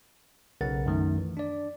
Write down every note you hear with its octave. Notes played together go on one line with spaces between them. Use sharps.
B1 C#3 A#4 F#5 A6
F#2 D#3 A3
E3
D4 D5